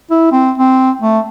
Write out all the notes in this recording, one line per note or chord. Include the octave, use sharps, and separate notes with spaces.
E4
C4
C4
A3